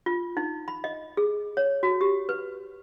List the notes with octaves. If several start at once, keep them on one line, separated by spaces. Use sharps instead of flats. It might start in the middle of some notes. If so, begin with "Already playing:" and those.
F4
D#4
B5
D#5
G#4
C#5
F#4
G4
B4